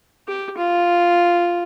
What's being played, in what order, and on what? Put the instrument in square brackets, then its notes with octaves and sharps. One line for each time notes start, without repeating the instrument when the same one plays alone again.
[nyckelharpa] G4
F4